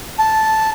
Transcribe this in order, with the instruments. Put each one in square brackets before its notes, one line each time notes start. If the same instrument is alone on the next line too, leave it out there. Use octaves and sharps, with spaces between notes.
[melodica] A5